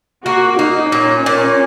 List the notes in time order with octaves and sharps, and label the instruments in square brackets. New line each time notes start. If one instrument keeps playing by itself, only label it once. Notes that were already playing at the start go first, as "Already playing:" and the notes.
[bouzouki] A#3 [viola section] F#4
[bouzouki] A#3 [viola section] D#4
[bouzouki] A#2 [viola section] C#4
[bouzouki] A#2